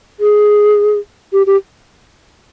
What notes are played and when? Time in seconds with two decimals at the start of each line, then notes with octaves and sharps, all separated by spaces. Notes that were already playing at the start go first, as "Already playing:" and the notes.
0.20 G#4
1.33 G4
1.47 G4